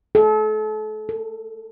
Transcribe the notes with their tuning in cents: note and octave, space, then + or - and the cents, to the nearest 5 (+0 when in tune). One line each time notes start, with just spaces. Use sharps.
A4 -35
A4 +25